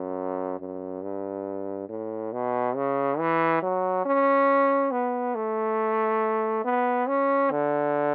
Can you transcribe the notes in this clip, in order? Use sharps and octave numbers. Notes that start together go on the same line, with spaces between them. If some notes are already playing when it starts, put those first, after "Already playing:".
Already playing: F#2
F#2
G2
A2
B2
C#3
E3
F#3
C#4
B3
A3
B3
C#4
D3